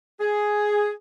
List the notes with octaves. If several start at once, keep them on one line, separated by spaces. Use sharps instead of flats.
G#4